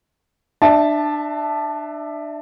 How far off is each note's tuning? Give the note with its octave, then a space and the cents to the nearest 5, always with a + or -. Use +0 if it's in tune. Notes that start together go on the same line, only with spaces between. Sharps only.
D4 +25 E5 +0 A5 -5